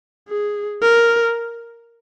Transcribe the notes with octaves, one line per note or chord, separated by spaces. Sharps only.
G#4
A#4